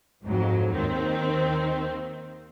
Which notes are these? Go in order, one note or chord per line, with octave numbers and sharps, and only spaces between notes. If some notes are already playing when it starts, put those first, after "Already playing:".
F2 G#2 F#3
D#2 D#3 C4